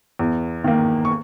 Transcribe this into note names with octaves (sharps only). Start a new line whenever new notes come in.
E2
D#3 A#3
C#6